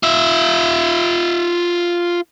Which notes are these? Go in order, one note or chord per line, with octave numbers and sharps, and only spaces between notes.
F4 E5